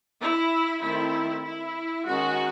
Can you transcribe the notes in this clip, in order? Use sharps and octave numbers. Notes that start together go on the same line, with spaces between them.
E4
D#3 A3 C4 E4
E4
D#3 G#3 C#4 F#4